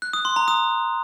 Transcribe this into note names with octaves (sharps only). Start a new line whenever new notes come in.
F#6
D#6
C6
A#5
D#6